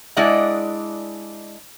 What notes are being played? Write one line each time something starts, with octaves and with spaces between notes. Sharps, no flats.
G#3 D4 E4 D5 D#5 F#5